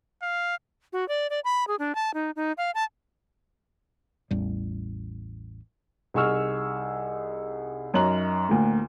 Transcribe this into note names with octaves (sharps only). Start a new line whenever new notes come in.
F5
F#4
D5
D5
B5
G#4
D4
A5
D#4
D#4
F5
A5
A1 E2 G3
C2 D#4 G#4 C#6 E6 F6
F#2 D#4 C#5 A#5 F#6 F#7
D2 A2 A#3